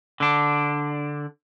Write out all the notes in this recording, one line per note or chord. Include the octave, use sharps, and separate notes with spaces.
D3 D4